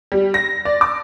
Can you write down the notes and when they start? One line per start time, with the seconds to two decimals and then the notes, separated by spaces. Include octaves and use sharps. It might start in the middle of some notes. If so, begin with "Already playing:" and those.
0.12 G3
0.34 A#6
0.65 D5
0.81 D6